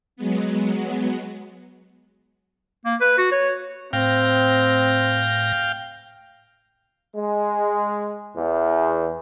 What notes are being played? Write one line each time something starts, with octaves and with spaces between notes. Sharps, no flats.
F#3 G#3 B3
A#3
B4
F#4
C#5
A2 C4 F5 G5 A#6
G#3
E2